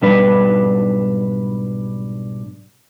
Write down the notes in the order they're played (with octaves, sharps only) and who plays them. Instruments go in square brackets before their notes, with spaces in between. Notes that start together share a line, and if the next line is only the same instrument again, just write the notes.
[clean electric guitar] B1 G#2 G3 D4 B4